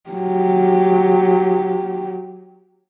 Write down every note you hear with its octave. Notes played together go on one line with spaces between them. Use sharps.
F#3 G4